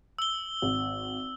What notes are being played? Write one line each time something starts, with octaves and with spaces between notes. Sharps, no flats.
E6 G7
G#1